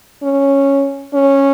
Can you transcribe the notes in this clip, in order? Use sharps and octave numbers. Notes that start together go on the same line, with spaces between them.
C#4
C#4